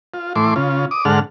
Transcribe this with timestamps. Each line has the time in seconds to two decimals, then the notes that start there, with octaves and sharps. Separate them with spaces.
0.14 F4
0.36 A2 E3 C6 D6
0.56 C#3 F4
0.91 D6 D#6
1.05 G#2 D3 A4 F#5 F6